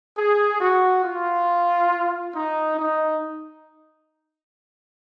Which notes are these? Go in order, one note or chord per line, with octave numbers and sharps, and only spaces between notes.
G#4
F#4
F4
D#4
D#4